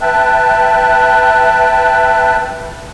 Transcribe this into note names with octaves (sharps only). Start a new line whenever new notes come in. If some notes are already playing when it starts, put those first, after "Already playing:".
B4 E5 G5 A5 F#6